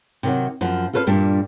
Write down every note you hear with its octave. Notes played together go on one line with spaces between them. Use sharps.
C3 D#3 F#3
F#2 F3
F4 A4 B4 C5 F5
G2 A#2 G3 D4